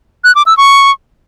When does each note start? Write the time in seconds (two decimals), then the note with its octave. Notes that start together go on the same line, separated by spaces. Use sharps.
0.24 F#6
0.35 D6
0.46 E6
0.57 C#6